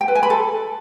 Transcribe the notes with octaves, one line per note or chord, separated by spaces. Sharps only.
G5
B4
G#5
B5
A4